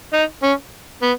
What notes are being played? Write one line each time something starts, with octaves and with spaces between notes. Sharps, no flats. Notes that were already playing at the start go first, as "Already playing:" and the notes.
D#4
C#4
B3